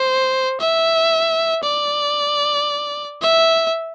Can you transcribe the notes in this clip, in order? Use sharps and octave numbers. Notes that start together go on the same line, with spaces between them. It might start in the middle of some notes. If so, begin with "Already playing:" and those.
Already playing: C5
E5
D5
E5